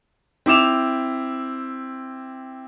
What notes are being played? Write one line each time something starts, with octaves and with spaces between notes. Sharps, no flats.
C4 E4 D6 E7 F7